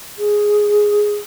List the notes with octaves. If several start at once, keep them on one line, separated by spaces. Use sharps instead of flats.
G#4